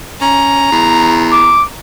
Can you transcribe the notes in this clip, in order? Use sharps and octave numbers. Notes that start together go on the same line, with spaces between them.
C#4 A#5
E2
D6